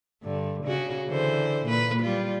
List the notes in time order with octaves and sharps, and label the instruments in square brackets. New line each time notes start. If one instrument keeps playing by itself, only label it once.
[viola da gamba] G2 D3
C#3 F#4
D3 E3 C5
A#2 B4
G3 F4